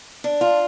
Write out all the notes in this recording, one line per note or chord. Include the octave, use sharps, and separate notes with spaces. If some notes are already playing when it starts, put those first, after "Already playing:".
D4
F4